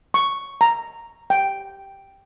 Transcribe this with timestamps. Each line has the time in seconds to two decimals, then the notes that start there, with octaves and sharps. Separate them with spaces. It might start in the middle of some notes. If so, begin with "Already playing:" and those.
0.14 C#6
0.61 A#5
1.30 G5